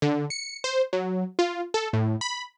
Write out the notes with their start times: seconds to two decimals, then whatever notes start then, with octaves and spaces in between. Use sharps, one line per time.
0.02 D3
0.30 C#7
0.64 C5
0.93 F#3
1.39 F4
1.74 A4
1.93 A2
2.21 B5